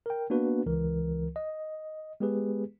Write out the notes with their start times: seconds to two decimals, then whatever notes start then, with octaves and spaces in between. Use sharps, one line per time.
0.06 A#4 G5
0.30 A#3 B3 D4 F#4 B4
0.66 C#2 E3 A#4
1.36 D#5
2.20 G#3 B3 G4 G#4 B4